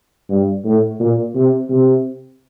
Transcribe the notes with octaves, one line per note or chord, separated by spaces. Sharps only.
G2
A2
A#2
C3
C3